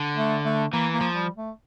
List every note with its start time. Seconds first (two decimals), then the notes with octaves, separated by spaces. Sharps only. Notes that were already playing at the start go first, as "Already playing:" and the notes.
Already playing: D3
0.17 A3
0.45 A3
0.73 E3 A#3
0.93 A#3
1.01 F3
1.15 G3
1.36 A3